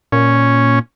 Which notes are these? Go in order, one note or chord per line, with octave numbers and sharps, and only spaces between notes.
A#2 C#4